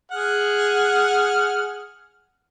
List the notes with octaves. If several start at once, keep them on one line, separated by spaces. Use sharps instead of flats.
G#4 F#5 F6